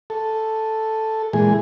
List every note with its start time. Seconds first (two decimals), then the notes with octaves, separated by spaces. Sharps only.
0.10 A4
1.33 A#2 E3 G#3 G#4